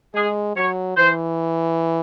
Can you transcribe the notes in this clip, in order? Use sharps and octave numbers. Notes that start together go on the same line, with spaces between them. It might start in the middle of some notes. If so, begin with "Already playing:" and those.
G#3 G#4
F#3 C#5
E3 C5